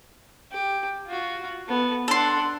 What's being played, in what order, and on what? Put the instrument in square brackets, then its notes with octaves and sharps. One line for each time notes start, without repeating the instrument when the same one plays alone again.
[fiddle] G4
F4 F#4
B3 A4
[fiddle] D4 F#5 [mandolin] A4 C6